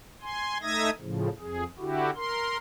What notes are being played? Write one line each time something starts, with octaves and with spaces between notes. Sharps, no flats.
G#5 C6
A3 D#4 E5 D#6 G#6 A#6
A2 C#3 F3
F2 G#4
D3 E4 F#4 G4
A#4 C6